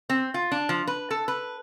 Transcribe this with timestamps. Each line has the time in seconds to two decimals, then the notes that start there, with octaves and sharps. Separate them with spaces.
0.10 C4
0.34 F4
0.52 D4
0.69 F3
0.87 B4
1.11 A4
1.28 B4